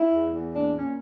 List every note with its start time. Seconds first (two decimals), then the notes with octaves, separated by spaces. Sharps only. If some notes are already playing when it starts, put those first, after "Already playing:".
Already playing: E4
0.12 E2
0.34 E2
0.54 A#2 D4
0.75 A#2 C#4